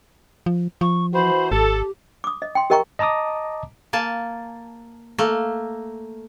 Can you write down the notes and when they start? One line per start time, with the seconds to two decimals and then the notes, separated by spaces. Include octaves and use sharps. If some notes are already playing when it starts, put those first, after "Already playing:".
0.46 F3
0.81 F3 C#6
1.14 E3 F#4 C5 B5
1.51 G#1 G4 A4
2.24 D6 D#6
2.42 D#5
2.55 G5 C6
2.70 G4 A#4 D#5 G5 A#5 C#6
2.99 D#5 A5 A#5 D6 D#6
3.93 A#3 G#5 A5
5.18 A3 A#3